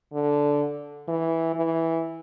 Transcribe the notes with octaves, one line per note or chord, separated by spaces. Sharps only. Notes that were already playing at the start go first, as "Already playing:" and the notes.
D3
E3
E3